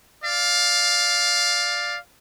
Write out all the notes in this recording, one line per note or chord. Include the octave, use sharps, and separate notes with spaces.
D5 F5